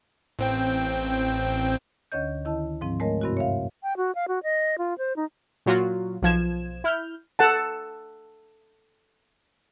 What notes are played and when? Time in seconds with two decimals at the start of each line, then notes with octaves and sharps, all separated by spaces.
0.39 A1 C4 G5
2.12 D2 D3 C#4 C#5 D#5 G6
2.45 D#3 E4 D#5 A5
2.81 G#2 F3 C4
3.00 G#3 A3 A#4 C#5 D#5
3.21 G2 C3 C4 E4 F#4
3.37 C#5 E5 F5
3.83 G5
3.97 F#4
4.15 F5
4.28 F#4
4.43 D#5
4.78 F4
4.98 C5
5.16 D#4
5.66 A#2 F#3 F4 F#4
6.22 B1 F3 G#6 E7
6.84 E4 F6 G6
7.39 A4 F#5 A5